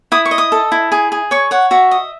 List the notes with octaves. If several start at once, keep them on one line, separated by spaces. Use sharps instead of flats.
E4 D#6
C#6
D#5
D#6
A4
E4
G#4
G#4
C#5 C#6
C#5 F#5
F#4 E5
D#5